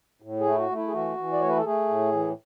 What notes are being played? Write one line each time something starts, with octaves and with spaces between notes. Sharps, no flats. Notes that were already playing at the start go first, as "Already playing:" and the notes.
A2
G#4
A3
E4
F#4
A3
E4
G#4
E3 F#4
E3
D5
A3 C#5
B4
A4
A3 G#4
A2
E3